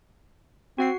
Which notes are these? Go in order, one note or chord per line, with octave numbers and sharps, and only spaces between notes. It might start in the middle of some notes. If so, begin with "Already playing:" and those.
C4 F#4 F#5 C7